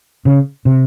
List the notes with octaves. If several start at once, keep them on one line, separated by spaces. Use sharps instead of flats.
C#3
C3